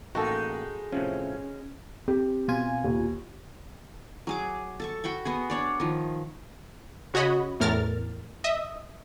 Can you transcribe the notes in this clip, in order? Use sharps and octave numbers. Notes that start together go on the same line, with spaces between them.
A1 G#3 A#3 D#4 F#4 A4 G5
A2 C3 F3 C#4
C4 G4
B2 F4 G#5
D#2
F#3 G#4 D6
A4 A5 C#6
F#4 G5 B5 C#6
B3 F#4 G#4
D4 C#5 D5
D#3 F3
C#3 F#4 C#5 D#5 B5
E2 A2 A#4 F6 A6
D#5 E5 D#6